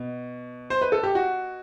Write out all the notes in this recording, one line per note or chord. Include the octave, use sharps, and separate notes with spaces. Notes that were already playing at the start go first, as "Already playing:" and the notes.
Already playing: B2
C5
B4
A4
G4
F#4